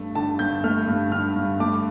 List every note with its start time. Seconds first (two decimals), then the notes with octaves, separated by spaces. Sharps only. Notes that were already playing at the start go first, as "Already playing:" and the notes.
Already playing: G2 A3
0.15 D3 A5
0.39 G2 G6
0.64 A3 F6
0.87 G2
1.12 D3 F6
1.36 G2
1.60 A3 D6